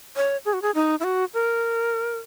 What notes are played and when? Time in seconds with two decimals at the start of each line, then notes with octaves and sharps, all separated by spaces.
0.16 C#5
0.45 G#4
0.53 F#4
0.62 G#4
0.75 D#4
1.00 E4
1.04 F#4
1.34 A#4